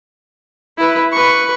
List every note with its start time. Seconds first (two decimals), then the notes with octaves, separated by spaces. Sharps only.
0.78 E4 B4
1.12 B4 C#6